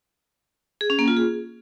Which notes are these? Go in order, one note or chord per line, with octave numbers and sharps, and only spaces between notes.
G#4
C#4
A#3
F4
G#4